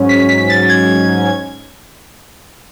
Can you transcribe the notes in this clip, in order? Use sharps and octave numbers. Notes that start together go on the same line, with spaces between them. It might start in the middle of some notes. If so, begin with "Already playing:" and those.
Already playing: G#2 F#3 C#4
B6
B6
A6
G#6